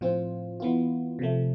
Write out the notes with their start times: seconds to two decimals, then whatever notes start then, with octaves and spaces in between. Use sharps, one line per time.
0.01 A2 F3 C4 F4
0.60 E3 B3 F4
1.19 C3 F3 A3